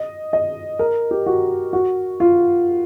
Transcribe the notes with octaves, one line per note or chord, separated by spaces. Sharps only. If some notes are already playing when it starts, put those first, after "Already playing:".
Already playing: D#5
D#5
A#4
G4
F#4
F#4
F4